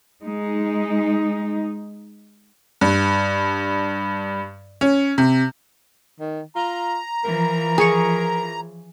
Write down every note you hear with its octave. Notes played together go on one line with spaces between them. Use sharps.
G#3 D#4
G2
C#4
C3
D#3
F4 A#5
E3 F3 A#4
G#4 C#5 C#6